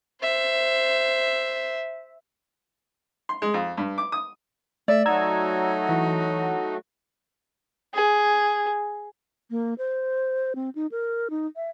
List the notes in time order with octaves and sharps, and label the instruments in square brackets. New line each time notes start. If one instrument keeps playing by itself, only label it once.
[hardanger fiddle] C5 E5
[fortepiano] C6
G#3
F2
G2
D6
D#6
[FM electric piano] A3 [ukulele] D5 [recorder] E5
[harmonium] F#3 A3 F#4 [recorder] D#4 [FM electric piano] A#5 E6 G#6
[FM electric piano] E3
[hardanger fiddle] G#4
[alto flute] A#3
C5
C4
D#4
A#4
D#4
E5